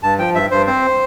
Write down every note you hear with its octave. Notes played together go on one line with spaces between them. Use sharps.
G2 A5
F3 G5
G2 E5
G2 C5
C4 C5